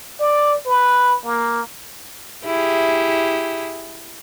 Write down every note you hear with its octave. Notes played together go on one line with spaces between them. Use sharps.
D5
B4
A#3
E4 G4 G#4